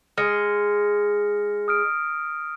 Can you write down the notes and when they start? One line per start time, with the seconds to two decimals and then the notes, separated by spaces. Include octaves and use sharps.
0.18 G#3 F6 A#6 C#7
1.68 D#6 F6 D7